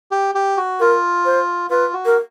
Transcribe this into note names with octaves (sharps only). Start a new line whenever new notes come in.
G4
G4
F#4
F4 A#4
C5
F4 B4
F#4
A#4